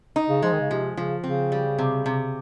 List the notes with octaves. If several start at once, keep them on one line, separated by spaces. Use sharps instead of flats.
D#4
C#3
F3 G#3
D#3
C#3
C3 F3
C#3 F3
C#3 C4
G3
C3
C3